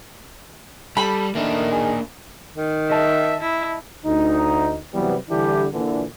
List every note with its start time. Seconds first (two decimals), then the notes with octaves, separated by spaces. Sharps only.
0.97 G3 A4 B5
1.35 D#3 A3 A#3 D4
1.72 G#4
2.55 D#3
2.90 D#5 E5 A5
3.41 E4
4.06 D2 D#4
4.94 C3 E3 F#3 G3 B3
5.30 D3 E3 G3 D4 E4 G4
5.74 A#2 D3 E3